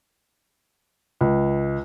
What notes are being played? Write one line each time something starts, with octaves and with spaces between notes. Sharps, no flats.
C#2